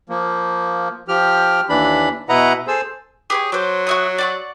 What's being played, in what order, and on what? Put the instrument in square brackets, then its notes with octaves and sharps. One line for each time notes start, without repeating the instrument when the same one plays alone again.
[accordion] F3 A#3
F3 G4 F6
D#2 E3 D4 B5
B2 E4 B4 D#5 F#5 A#5
G#4 A4 C5 E6
[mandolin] G4 B4 C#5 [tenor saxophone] G#4
[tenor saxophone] F#3 [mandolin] C5 D6
[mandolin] F#4 E5 D#6
D5 F#5 C#6